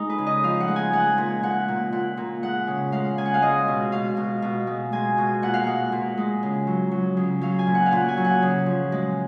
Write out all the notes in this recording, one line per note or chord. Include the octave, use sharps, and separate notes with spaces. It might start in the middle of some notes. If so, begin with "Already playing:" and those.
Already playing: G#3 D#4
B4
C#3
D#5
F3 F5
F#5
G#3
G#5
G#3 F#5
A#2
A#2 F#5
A#2
A#2 F#5
A#2
G#3 F#5
C#3
G#3 F5
C#3 G#5
F#5
F5
G#3 D#5
B2
B2 F5
B2
B2
G#3
G#3 G#5
B2
A#2 F#5
F5
G#3 F#5
A#2
G#3
C#3
F#3
F#3
C#3
F#3 F5
G#5
A#2
F#5
F5
A#2 F#5
G#5
F#3
F#5
C#3
F3
G#3